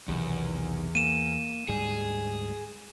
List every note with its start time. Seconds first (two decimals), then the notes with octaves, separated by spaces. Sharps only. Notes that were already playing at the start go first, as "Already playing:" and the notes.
0.08 B1 E2 C3 D#3
0.95 A#3 D#7 E7
1.69 D2 G#2 G3 G#4